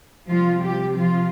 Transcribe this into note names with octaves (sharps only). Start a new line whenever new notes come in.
C3 F3 G3 F4
G3 G4
F3 F4